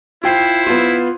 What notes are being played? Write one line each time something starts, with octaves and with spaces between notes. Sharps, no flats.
E4 F4 C5 G5 C7
B3 F4